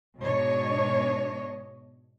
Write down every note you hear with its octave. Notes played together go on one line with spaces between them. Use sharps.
G#2 B2 D4 C#5 D#5